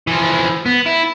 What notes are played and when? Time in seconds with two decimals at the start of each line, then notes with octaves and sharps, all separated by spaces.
0.07 E3 F3
0.66 B3
0.86 E4